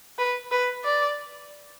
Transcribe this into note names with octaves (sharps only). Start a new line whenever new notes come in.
B4
B4
D5